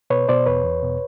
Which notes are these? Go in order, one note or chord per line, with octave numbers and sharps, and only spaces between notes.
B2 B4 C#5
B2 C5 D5
E2 B4 C#5
E2
B2